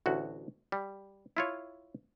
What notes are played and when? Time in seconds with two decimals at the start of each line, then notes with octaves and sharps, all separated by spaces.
0.06 A1 D2 F#4
0.72 G3
1.37 E4 F4 C#5